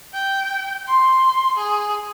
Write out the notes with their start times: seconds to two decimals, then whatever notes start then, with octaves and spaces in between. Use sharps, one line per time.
0.14 G5
0.88 C6
1.57 G#4